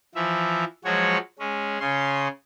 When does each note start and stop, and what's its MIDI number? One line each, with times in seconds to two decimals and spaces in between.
0.15 0.64 52
0.15 0.64 53
0.15 0.64 76
0.85 1.18 53
0.85 1.18 54
0.85 1.18 56
0.85 1.18 66
0.85 1.18 73
1.39 1.79 56
1.39 1.79 61
1.80 2.28 49
1.80 2.28 61
1.80 2.28 84